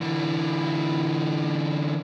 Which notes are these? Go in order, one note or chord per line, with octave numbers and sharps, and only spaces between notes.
D3 E3